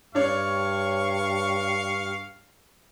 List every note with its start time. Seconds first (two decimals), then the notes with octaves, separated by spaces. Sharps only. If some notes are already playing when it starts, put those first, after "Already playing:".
0.15 G2 D4 C#5 F5 C#6